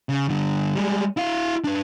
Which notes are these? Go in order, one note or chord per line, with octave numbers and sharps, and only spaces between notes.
C#3
G2 D3
G3 G#3
E4 F5
D4 B4